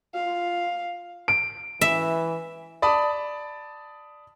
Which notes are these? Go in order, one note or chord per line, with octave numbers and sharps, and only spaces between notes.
F4 F5
D7
E3 E5
D5 A5 B5 D#6